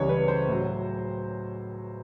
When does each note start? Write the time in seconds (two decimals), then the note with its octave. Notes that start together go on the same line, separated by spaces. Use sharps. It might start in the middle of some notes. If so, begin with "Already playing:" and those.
Already playing: C#2 C#3 E3 G3 C#5
0.09 B4
0.28 C5
0.48 A2 F#3